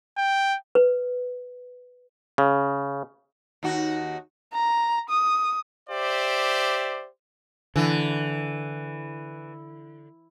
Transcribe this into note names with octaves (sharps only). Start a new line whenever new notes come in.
G5
B4
C#3
D#2 D#4 F#4
A#5
D#6
G4 C5 D5 E5
D3 E3